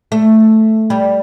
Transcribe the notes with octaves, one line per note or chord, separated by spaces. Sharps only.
A3
G3